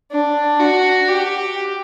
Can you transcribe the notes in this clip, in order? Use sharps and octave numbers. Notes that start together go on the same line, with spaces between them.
D4
F#4
G4